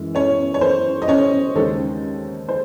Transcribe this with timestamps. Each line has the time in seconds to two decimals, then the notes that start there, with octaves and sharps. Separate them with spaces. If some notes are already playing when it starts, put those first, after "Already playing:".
Already playing: F#2 E3 G#3
0.15 C#4 C#5
0.54 C#5
0.61 C5
1.02 D#5
1.08 C#4 C#5
1.55 D#2 C#3 G#3 C4 D#4 A4
2.49 C5